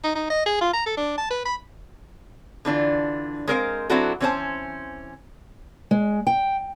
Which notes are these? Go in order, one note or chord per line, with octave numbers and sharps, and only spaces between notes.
D#4
D#4
D#5
G#4
F4
A#5
A4
D4
A5
B4
B5
D3 E3 D4 F4
G#3 C4 A#4 C5 D#5 F5
F#3 C4 D4 E4 F#4 A4
E3 C4 C#4 E4 C5 A5
G#3
G5